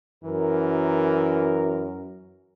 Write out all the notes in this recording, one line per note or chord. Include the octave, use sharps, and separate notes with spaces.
F#2 E3 A#4